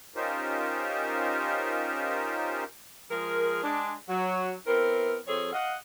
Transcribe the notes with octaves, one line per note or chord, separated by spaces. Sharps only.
C#4 D#4 F4 G4 A#4 C5
F3 G#3 G#4 A#4
G#3 D4
F#3
B3 C4 E4 A#4
F2 C4 G#4 A4 C#5
D#5 F5 F#5